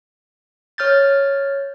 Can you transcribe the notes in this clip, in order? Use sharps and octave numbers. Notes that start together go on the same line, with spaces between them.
C#5 F6 G6 A6